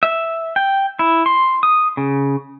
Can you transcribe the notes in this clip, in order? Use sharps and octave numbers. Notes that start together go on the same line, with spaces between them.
E5
G5
E4
C6
D#6
C#3